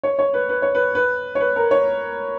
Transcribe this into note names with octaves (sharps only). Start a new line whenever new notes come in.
C#5
C#5
B4
B4
C#5
B4
B4
C#5
B4
A#4
C#5